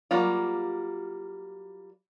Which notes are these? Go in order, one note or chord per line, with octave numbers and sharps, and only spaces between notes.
F#3 G3 A#3 F4